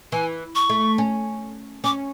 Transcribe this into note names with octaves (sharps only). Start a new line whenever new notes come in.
E3 G#5
C#6
A3
C#4
C#4 D6